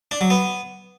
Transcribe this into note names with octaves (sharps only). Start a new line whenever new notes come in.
D4
F#3
B3